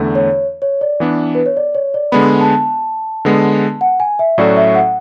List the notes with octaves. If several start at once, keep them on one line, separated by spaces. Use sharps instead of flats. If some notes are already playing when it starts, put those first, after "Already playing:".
Already playing: E2 D3 A3
C#5
C#5
D5
E3 B3 D4
B4
C#5
D5
C#5
D5
D3 G#3 B3 B5
A5
D3 G#3 B3
F#5
G#5
E5
A2 F#3 C#4 F#4 A4 D5
E5
F#5